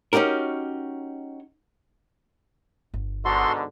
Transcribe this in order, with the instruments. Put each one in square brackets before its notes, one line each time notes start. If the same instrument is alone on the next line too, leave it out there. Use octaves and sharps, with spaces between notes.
[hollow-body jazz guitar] C#4 D#4 F#4 G4 A#4
[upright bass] G1
[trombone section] G#2 B2 D3 [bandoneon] F#4 A4 C6